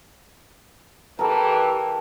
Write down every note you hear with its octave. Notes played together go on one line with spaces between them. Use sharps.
E3 G4 A4 A#4